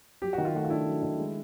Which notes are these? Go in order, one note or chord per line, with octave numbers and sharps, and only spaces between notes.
F#3 G4
D#3 F#4
F4
A3 F#4
F4
D4 E4
F#3
D#3
G#3